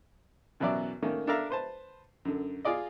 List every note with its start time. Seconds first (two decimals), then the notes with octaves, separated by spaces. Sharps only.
0.60 F#2 B2 E3 F#3 E4 D5
1.02 D#3 A3 A#3 C#4
1.27 D4 A4 A#4 E5 F5 A#5
1.50 B4 C5 A5
2.25 F#2 D3
2.65 F4 G#4 D5 D#5